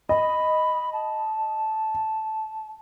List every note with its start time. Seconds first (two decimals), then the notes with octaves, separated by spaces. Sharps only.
0.09 D#5 B5
0.93 A5